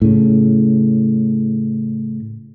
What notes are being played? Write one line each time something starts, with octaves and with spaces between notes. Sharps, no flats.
A2 C#3